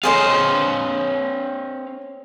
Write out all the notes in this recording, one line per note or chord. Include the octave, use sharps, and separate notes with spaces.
C4 G#4 C5 C#5 D#5 F5